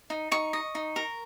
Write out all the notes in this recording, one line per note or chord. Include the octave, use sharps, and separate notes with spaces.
D#4
D#4 C#6
D#5
D#4
A#4